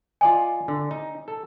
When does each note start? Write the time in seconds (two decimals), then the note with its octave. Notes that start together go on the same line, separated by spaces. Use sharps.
0.21 F4 D5 D#5 G#5
0.68 D3
0.91 D#4
1.28 A4